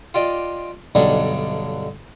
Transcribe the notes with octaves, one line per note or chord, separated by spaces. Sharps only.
F4 G4 D5 D#5
B1 G2 D3 D4 D#4 G4